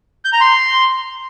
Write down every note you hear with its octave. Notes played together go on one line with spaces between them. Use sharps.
G6
A#5
C6